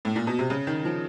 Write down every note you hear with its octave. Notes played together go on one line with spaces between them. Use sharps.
A2
A#2
B2
C3
C#3
D#3
F3